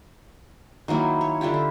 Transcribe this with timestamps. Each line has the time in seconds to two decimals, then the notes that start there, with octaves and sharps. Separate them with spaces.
0.88 D#3 F#3 A#3 E4
1.21 C#5
1.41 D3 E4 F4 G4
1.54 A4